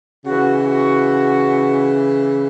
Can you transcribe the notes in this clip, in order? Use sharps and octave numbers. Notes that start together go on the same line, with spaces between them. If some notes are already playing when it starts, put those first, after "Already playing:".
C#3 E3 F#4
F#4